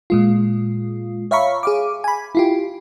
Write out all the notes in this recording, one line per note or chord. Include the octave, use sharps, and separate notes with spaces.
A#2 G#3 F4
C#5 E5 F5 A#5 B5 C#6
G#4 F5 D6
G#5 B5
E4 F4 G4